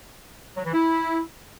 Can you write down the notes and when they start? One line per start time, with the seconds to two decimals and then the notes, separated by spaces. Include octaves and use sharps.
0.57 F#3
0.65 E3
0.73 E4